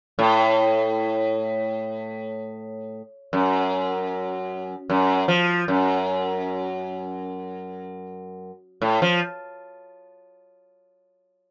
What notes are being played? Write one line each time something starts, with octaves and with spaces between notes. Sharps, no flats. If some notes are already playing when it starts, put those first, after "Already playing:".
A2
F#2
F#2
F3
F#2
A2
F3